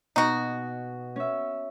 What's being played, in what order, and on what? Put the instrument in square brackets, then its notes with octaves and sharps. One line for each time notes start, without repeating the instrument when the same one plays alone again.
[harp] B2 [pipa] D#4 F#4
[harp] C#4 E5